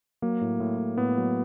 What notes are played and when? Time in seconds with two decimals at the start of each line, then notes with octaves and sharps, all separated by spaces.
0.22 F#3 A#3
0.41 A2
0.60 A2
0.79 A2
0.98 A2 B3
1.17 F#3